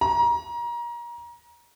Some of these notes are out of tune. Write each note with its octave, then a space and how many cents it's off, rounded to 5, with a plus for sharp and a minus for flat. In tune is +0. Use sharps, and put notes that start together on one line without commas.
A#5 +30